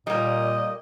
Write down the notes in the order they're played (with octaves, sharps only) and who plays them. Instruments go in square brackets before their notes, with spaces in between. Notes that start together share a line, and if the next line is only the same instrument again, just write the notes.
[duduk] A#2 [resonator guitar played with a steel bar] G3 A#3 [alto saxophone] D#5